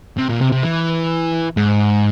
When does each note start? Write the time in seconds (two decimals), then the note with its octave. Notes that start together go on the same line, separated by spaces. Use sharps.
0.18 C3
0.29 A#2
0.41 C3
0.52 C3
0.64 E3
1.57 G#2